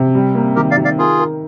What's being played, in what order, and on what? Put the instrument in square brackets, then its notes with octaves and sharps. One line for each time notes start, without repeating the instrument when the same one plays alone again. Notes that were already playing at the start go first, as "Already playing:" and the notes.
Already playing: [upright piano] C3
G3
A#3
[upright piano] D#3 [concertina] G4 A#4
[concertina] D5 F5
[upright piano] D#3
[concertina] D5 F5
[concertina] F4 G#4 [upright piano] A#4
[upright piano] A#4